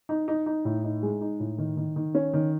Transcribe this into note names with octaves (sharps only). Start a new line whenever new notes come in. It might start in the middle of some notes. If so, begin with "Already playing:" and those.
D#4
D#4
D#4
A2
D#4
G#3
D#4
A2
D#3
D#3
D#3
C#4
D#3